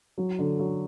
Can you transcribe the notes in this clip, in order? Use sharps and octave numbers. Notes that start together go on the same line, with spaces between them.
F#3
D3
F#3